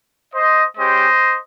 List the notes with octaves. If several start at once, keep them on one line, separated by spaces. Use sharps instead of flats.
C5 D#5
G#3 C#4 G4 C5 D#5